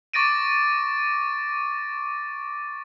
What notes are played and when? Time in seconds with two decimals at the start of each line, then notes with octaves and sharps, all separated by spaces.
0.14 C#6 D6 A6 A#6 D7 D#7